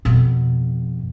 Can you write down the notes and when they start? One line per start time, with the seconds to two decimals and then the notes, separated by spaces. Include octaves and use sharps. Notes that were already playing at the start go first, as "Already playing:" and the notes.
0.05 F2 B2